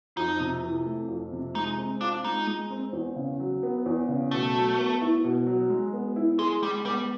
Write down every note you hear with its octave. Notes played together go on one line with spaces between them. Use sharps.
F2 D#4
C3
E3
A3
F2
C3
G#3 D#4
C4
D4 F4
G#3 D#4
G#3
C4
E2
C#3
F#3
B3
E2
C#3
B2 A3
F#3
B3
E4
B2
F#3
G#3
B3
E4
G#3 G#4
G3 G#3
G3 B3